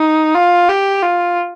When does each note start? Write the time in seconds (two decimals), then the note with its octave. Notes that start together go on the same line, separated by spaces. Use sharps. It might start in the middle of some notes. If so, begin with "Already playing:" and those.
Already playing: D#4
0.35 F4
0.68 G4
1.03 F4